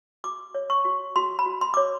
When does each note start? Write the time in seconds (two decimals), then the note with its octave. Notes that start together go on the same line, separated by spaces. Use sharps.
0.24 F#4 D6
0.55 C#5
0.70 C#6
0.85 F#4
1.16 F#4 C6
1.39 B5
1.46 F#4
1.61 C6
1.74 C#5 D6